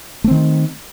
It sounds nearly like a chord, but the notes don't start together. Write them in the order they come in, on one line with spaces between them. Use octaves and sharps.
A3 C4 D#3